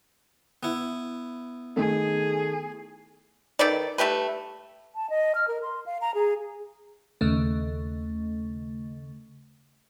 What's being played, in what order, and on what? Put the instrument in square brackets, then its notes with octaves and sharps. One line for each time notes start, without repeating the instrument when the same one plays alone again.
[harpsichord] B3 E4
[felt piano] D#3 A3 [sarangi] G#4
[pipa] D#3 A4 B4 D5
G3 A3 G4 B4
[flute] A5
D#5
F6
A#4
C6
F5
A#5
G#4
[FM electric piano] D#2 C#3 A3